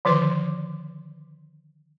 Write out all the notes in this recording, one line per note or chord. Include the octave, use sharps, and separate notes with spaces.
D3 D#3 F3 B4 C6